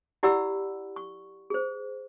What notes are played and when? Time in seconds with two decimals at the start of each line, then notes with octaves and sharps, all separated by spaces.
0.23 E4 G4 D5 F#5 B5 E6
0.96 C#6
1.50 G#4 C5